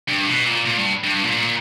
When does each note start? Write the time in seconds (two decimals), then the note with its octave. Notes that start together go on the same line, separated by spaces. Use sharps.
0.08 G2
0.26 B2
0.47 A#2
0.66 A#2
0.78 G2
1.04 G2
1.23 A#2